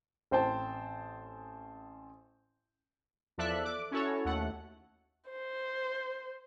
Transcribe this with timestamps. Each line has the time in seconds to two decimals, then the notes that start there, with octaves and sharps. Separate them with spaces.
0.31 A1 C4 C5 G5 A5
3.38 E2 F3 A4 D5 E5 F#6
3.65 D6
3.91 C#4 E4 F#4 A4 C#5
4.25 D#2 A3 F#5
5.30 C5